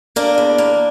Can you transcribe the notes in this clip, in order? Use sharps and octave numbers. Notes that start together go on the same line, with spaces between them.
A#3 D4
E2
A#3